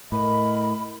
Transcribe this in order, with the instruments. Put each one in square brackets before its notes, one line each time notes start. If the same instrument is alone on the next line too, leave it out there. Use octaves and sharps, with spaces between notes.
[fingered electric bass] A2 [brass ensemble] A#4 D#5 [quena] B5